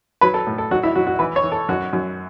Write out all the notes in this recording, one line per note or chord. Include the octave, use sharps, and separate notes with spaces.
F#3 B4
A4
A2
A4
F#3 F#4
E4
F#3 F#4
F#4
E3 B4
C#5
E3
A4
F#2 F#4
F#2